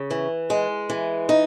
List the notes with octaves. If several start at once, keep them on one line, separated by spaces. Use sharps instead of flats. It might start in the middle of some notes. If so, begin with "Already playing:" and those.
Already playing: C#3
E3
G#3
E3
D#4